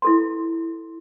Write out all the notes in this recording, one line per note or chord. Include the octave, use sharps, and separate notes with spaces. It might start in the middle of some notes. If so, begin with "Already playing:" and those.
E4 A4 C6